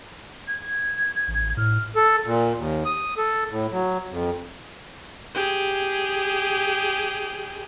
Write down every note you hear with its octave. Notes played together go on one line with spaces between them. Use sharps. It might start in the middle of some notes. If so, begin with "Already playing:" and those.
G#6
A1
A2 F6
A4
A#2
D#2
D#6
A4
A2
F#3
F2
G4 G#4